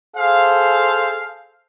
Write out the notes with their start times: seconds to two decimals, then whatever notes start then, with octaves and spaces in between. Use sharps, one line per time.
0.16 G#4 A4 C5 F5